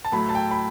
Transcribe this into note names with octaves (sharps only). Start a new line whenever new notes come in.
A5
A2 F#3 A3 B5
A5
G5
B5